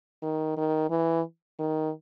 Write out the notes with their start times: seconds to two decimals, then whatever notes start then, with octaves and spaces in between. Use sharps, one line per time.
0.22 D#3
0.57 D#3
0.90 E3
1.59 D#3